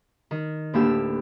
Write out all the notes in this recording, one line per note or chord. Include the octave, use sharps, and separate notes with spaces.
D#3
D2 A2 A#3 D4 G4 E6